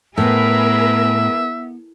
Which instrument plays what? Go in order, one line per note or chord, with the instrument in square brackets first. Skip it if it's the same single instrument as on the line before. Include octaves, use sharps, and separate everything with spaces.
[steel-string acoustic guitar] A2 [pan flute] B3 [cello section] G#4 A#4 B4 [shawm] E5